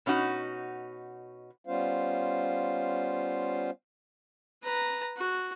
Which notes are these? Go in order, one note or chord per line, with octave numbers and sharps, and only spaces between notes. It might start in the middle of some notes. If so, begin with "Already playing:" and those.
B2 C#4 D#4 F#4
G3 B3 C#4 F4 C5 F5
B4 A#5
F#4